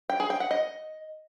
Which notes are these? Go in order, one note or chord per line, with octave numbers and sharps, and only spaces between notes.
G5
G#4
G5
F#5
D#5